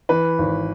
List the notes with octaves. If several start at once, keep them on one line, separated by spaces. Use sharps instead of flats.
E3 B4
G#1